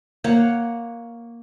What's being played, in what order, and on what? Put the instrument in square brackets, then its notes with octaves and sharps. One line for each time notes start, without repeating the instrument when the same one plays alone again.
[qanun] A#3 C#5 F#5